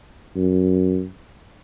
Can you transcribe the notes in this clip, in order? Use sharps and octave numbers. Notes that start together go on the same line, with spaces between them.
F#2